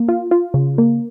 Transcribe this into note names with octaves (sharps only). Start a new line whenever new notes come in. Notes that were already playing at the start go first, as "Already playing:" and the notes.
Already playing: A#3
F4
F4
C#3
A#3